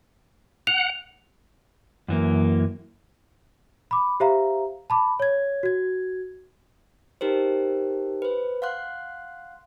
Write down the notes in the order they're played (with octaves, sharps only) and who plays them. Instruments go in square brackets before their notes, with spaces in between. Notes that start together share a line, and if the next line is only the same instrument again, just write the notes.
[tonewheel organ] F#5 [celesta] F7
[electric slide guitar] F#2 E3 A#3
[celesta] B5 D6
G4 C5 E5 F5 A#5
A5 B5 D6
C#5 G#6
F#4 G#6
[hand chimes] D#4 G4 A#4 C5
B4 C5
F5 F#5 C6 F#6